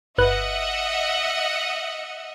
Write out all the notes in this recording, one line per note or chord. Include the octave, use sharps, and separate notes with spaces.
G1 B4 D#5 E5 F#5 F#6